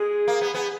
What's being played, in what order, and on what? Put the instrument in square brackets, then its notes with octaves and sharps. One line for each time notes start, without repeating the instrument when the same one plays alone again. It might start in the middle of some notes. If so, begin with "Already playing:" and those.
Already playing: [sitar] G#3 [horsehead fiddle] G#4
[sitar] A#3
B3
B3